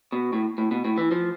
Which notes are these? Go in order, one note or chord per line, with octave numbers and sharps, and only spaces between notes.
B2
A2
A2
B2
A2
E3
F3